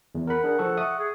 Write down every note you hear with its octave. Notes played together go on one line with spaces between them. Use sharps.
E2
A#4 F#5 B5
D4 G#4 A#4
F3 A4 C#6
E5 C#6 D#6
G#4